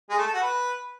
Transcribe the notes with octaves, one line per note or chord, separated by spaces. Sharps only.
G#3
A3
A4
F#4
B4